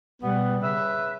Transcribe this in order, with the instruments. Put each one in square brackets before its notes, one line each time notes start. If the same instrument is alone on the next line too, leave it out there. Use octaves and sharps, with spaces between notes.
[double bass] B2 G3 [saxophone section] B3
[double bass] C#3 [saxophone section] B4 E5